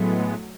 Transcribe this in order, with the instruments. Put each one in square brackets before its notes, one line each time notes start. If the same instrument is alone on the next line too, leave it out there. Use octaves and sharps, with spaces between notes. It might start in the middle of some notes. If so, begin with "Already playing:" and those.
Already playing: [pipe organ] A2 G#3 B3 [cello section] F#3 A3